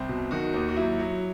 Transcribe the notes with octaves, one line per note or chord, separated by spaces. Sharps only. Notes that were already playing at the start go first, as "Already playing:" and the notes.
Already playing: C2 C4
B2
D#3 F#4
D#2
F#4
F#3 E4
F#3